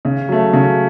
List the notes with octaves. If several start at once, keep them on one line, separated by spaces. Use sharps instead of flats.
C#3
F#3 A3
C#3